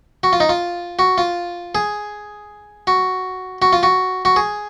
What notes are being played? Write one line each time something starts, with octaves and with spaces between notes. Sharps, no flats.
F#4
F4
D#4
F4
F#4
F4
G#4
F#4
F#4
F4
F#4
F#4
G#4